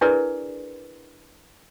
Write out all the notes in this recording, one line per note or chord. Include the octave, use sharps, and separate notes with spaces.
D4 E4 G#4 A#4 B4 D5